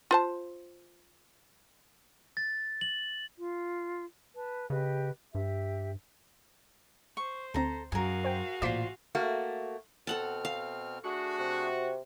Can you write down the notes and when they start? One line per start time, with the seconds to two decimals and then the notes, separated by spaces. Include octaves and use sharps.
0.11 F4 C5 A5
2.37 A6
2.81 F#7
3.38 F4
4.37 B4 A5
4.70 C#3 G4 B4 D#5
5.35 G2 G4 E5
7.17 C5 C#6
7.54 D2 C4 A4 A#5
7.92 F#2 F#4 G#4 A#4 F5 G#5
8.24 C5 G5
8.62 A1 A#2 F4 C5 D5 B6 C7
9.15 A3 A#3 F#4
10.07 B2 C4 A4 F#5 A5 F6
10.45 F5
11.05 A3 D4 F#4 G#4
11.38 C3